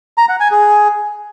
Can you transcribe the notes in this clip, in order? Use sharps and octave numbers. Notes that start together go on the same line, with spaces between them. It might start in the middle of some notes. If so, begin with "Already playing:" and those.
A#5
F#5
G#5
G#4